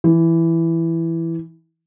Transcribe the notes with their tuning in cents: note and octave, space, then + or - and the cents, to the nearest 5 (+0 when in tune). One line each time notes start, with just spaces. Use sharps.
E3 +5